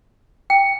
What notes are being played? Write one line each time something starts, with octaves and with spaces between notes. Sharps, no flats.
G5